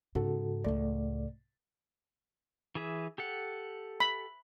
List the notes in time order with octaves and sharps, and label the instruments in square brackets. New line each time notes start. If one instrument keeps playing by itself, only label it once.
[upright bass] G#2 [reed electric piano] C#3 F#4 A4
[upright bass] C#2 A2 [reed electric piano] A3 D5
[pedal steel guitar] E3 G#4 E5
G4 A4 F#5
[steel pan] B5